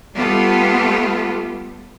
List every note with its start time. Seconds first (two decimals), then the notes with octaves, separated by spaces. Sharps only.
0.14 G3 A3 B3 F4 G4 A4